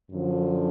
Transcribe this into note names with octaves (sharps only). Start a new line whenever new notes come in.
F#2 D3 F3